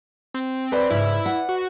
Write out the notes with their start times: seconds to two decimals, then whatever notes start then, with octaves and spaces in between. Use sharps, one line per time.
0.34 C4
0.72 B4 D5 B5
0.90 G#2 C#3 E4
1.26 F#5
1.49 F#4